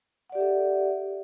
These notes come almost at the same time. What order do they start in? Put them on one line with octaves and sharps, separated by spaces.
F#5 D5 G4 E5 A4